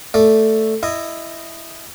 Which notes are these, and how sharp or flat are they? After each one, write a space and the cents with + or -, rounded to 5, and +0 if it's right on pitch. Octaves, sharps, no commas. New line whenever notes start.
A3 +0 D5 +0
E4 +5 D#5 -10